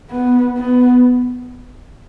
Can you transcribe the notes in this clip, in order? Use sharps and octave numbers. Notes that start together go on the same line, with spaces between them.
B3
B3